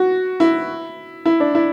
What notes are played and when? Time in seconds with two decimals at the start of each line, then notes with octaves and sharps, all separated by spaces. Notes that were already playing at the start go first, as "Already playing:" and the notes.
Already playing: F#4
0.40 E4
1.26 E4
1.40 D4
1.55 E4